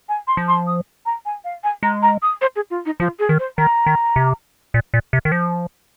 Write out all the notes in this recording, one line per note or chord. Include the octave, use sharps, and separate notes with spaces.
G#5
C6
F3
C6
D#6
A#5
G#5
F5
G#5
G#3 A#5
A#5
D#6
C5
G#4
F4
D#4
F3 F4
G#4
D#3
C5
D#3 A#5
D#3
C3
A#2
A#2
C3
D#3
F3